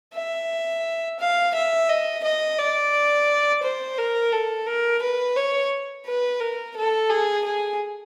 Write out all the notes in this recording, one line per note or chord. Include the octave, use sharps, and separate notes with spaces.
E5
F5
E5
D#5
D#5
D5
C5
A#4
A4
A#4
B4
C#5
B4
A#4
A4
G#4
G#4